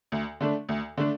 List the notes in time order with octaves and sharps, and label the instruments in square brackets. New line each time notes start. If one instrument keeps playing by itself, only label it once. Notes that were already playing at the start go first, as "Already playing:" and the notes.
[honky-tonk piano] D2
D3 A3 D4
D2
D3 A3 D4